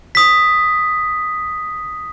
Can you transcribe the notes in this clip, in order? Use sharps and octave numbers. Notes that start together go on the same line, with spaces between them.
D#6 B6